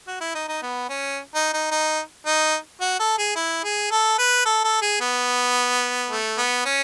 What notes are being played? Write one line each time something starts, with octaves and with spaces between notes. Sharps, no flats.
F#4
E4
D#4
D#4
B3
C#4
D#4
D#4
D#4
D#4
F#4
A4
G#4
E4
G#4
A4
B4
A4
A4
G#4
B3
A3
B3
C#4